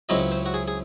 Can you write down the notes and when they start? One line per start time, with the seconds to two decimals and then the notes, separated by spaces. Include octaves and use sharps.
0.09 C#2 C#3 F#3 C4 E4 D#5
0.32 C5
0.46 F#4
0.54 G#4
0.68 G#4